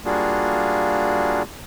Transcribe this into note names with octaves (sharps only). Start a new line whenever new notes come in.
G3 A#3 D4 F4 F#4 G#4